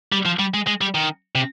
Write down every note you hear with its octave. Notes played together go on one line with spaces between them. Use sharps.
G3
F3
G3
G#3
G#3
G3
D#3
C3